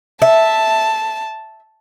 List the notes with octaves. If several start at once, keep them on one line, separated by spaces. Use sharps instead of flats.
E5 A5